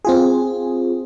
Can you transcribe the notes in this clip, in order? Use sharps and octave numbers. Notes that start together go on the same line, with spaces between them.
C4 F4 G#4